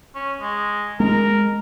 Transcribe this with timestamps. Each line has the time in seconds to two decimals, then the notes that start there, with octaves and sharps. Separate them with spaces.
0.15 C#4
0.41 G#3
1.00 G#3 A#4